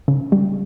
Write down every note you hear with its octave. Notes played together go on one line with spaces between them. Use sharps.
C#3
G3